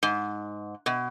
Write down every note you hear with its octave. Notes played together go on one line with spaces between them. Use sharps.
G#2
B2